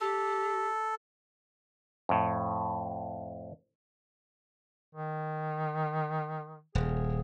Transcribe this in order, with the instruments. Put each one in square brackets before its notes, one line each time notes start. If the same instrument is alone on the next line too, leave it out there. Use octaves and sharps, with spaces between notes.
[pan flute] G4 [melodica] A4
[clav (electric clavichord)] F2 A2
[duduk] D#3
[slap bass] D#1 [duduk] G#4